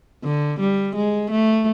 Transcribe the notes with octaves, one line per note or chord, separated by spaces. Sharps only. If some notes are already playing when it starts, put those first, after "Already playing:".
D3
G3
G#3
A3